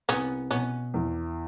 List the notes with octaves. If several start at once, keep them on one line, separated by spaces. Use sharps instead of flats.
C2 B3 C#4
B2 B3 C#4
E2